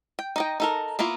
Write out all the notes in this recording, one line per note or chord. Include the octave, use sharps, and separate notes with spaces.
G5
D#4 D#5 G5
D#4 A4 A#4
A#3 B3 E4 F4